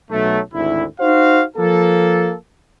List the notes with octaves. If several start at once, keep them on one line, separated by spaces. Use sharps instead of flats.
B1 F#3 A3
G#1 D2 E4
D#4 F#4 C5 F5
F3 A#3 A4